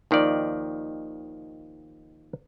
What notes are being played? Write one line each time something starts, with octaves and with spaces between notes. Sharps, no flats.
D#2 D#3 F3 D5